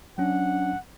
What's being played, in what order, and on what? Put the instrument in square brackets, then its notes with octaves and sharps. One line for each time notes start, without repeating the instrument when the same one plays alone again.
[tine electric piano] F#3 C#4 [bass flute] D4 [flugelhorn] F#5